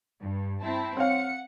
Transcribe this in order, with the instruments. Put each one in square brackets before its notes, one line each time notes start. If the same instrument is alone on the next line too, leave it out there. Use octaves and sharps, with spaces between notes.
[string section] G2
C4 E4 A5
[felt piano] C4 C#5 F5 [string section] F#5 C#7